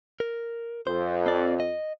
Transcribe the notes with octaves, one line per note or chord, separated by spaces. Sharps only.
A#4
F2 C5
C4 D5
D#5